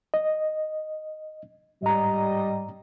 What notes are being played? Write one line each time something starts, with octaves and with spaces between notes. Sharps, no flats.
D#5
G#2 G3 D#5 A#5